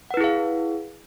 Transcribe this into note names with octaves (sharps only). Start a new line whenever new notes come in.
E4 G#4 B4 F5 F#5